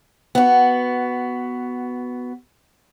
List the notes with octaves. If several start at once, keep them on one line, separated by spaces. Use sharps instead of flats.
B3 F#4